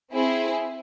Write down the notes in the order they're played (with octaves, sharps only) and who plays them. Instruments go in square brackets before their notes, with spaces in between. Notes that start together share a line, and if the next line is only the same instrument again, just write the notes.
[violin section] C4 E4 G#4